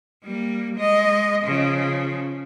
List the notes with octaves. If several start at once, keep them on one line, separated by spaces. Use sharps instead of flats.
G3 A#3
G#3 D#5
C#3 F3